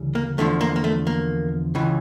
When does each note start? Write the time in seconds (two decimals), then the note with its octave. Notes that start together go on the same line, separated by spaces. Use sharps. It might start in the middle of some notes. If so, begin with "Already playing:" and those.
Already playing: D2 C#3 E3 G3
0.15 A#3
0.38 E2 D3 F3 A3
0.61 A#3
0.76 A#3
0.84 A3
1.07 A#3
1.75 C#2 C#3 E3